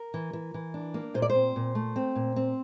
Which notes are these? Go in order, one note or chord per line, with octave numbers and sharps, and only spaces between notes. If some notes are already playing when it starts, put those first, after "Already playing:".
Already playing: A#4
E3
E3
E3
D4
A#3
A#2 C5
D5
C5
C4
A#2
A3
C4
A#2
C4